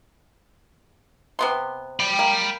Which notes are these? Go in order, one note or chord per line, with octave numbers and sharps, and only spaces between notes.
C3 B3 C6
G5 B5
A#3